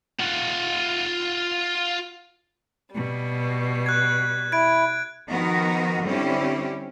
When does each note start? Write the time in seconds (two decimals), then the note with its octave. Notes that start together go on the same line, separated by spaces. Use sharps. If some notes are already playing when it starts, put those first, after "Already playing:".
0.20 F4 F#5
2.92 B2 G3
3.86 F#6 G#6
4.52 E4 G#6 D7
5.30 D#3 F3 B3 D#4 F#4 A#4
6.04 D3 G3 C4 C#4 E4 G4